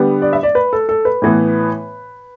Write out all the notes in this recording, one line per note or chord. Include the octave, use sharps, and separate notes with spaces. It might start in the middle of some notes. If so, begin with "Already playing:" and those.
Already playing: D3 G3 B3
D5
E5
D5
B4
A4
A4
B4
A2 E3 B3